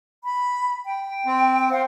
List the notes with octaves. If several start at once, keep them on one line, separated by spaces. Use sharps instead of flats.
B5
G5
C4
C5 F5 F#5